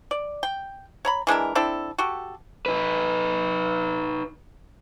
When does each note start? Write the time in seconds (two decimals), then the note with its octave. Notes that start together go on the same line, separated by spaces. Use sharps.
0.11 D5
0.43 G5
1.05 C#5 A#5 B5
1.27 E3 G#3 D4 A#4
1.55 C4 D4 E4 A4
1.98 F#4 G4 A4
2.66 D#4 B4